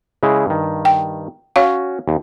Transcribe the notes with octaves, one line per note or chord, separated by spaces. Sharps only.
C#3 G#3 E4
G2 D#3
G5
C#4 F#4 C#5 F5
D#2